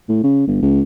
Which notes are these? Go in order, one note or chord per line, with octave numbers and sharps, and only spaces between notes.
A2
C#3
G1
C#2